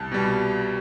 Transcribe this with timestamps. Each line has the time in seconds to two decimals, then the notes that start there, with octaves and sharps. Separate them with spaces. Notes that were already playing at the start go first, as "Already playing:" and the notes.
Already playing: C2 A5
0.12 B2 G3